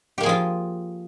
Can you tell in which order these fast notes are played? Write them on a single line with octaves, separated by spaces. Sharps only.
G4 A#3 G#4 F3 F4